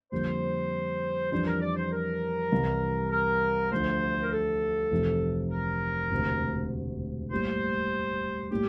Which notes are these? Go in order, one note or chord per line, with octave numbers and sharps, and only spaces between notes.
F2 D3 G3 A#3 C5
F2 E3 G3 D4 C5
A#4
D5
C5
A#4
C2 C3 E3 G3
A#4
D2 D3 F3 A3 C5
A#4
A4
F1 F2 C3 E3
A#4
E1 D2 C3
A2 G3 A#3 C5
A2 G3 A#3 G4